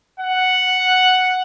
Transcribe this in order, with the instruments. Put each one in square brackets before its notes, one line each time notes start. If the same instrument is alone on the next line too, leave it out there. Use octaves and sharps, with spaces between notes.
[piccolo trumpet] F#5